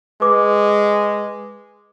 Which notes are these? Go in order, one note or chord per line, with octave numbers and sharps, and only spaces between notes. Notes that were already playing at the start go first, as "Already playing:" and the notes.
G#3 B4 D6